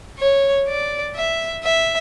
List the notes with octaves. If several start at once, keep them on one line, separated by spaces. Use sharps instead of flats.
C#5
D5
E5
E5